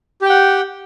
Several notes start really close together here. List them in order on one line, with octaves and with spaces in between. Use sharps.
G4 G5 F#5